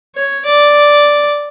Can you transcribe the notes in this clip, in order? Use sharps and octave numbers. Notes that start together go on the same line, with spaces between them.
C#5
D5